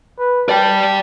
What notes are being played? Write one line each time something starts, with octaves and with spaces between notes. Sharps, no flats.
B4
D5 G5 A5